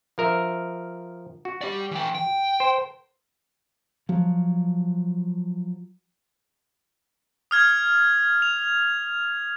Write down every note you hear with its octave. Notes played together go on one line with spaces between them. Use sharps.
F3 A#4 E5
F#4
G4 D5
E3 G5
G5
C5
F3 F#3
D#6 F6 G#6
F7